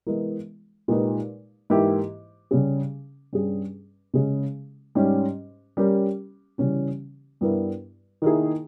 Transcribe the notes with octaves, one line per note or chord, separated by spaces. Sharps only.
E3 G#3 B3 E4 A#4
A#2 G#3 D#4 G4 B4
G#2 E3 A#3 E4 G4
C#3 G3 C#4 G#4
G2 G3 C#4 G#4
C#3 G#3 C#4 G#4
G#2 G3 C#4 G4
G3 C#4 G4 A#4
C#3 E3 G3 C#4 G4
G2 G3 B3 E4 A#4
D#3 A#3 E4 G#4